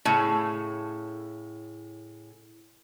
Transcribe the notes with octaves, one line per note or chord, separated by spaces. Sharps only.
A2 C#3